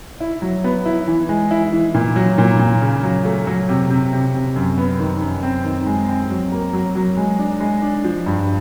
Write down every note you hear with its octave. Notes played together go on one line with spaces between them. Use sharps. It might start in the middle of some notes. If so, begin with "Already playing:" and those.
E4
F#3
B3
E4
E3
G#3
E4
E3
A#2
F#3
A#2
A#2
C#3
F#3
A3
F#3
C3
C3
C3
C3
F#2
B3
D#3
F#2
C4
D#3
G#3
C4
F#3
A#3
F#3
F#3
G#3
D4
G#3
D4
F3
G2